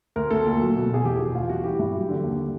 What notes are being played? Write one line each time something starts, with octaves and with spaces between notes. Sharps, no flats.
D2 A#4
D2 A4
A#2
F#3
B2
B2 G#4
E2 G4
B2 F#4
D2 F4
G3 F#4
E3 G4
G2
F#3
D3
D#2